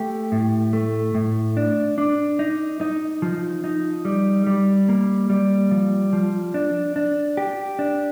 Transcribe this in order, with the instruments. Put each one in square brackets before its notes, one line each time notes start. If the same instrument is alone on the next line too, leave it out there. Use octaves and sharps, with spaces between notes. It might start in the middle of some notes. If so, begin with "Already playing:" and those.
Already playing: [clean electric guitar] A3 G4
A2
A3
A2
D4
D4
D#4
D#4
F3
D#4
G3
G3
A#3
G3
F3
F3
D4
D4
G4
D4